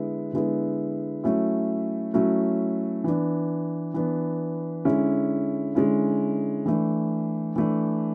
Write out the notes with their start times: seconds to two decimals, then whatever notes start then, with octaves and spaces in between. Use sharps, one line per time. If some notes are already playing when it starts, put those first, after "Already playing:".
Already playing: D3 G#3 B3 E4
0.33 D3 G#3 B3 E4
1.24 F#3 A3 C#4 E4
2.14 F#3 A3 C#4 E4
3.04 E3 B3 D4
3.94 E3 B3 D4
4.85 D3 G#3 C#4 E4
5.75 D3 G#3 C#4 E4
6.66 E3 A3 D4
7.56 E3 A3 D4